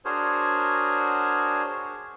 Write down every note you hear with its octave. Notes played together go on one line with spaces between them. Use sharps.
D4 F#4 G#4 A#4 C5 C#5